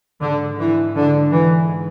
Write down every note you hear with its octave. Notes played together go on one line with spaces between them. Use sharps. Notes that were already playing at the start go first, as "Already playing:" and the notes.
G#2 D3
E3
D3
E3